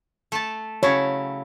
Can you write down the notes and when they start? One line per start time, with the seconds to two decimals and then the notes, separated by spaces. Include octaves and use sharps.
0.32 A3 A5
0.83 C#3 F#3 E4 C#5